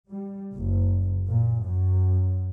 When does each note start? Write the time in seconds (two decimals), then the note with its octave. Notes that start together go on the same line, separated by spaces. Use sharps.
0.10 G3
0.56 F#1
1.29 A#2
1.63 F#2